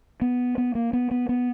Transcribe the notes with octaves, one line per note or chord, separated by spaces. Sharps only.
B3
B3
A#3
B3
B3
B3